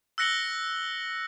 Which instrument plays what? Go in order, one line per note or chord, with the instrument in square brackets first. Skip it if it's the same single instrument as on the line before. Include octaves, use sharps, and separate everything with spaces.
[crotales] E6 F#6 A#6 C#7 F#7 G7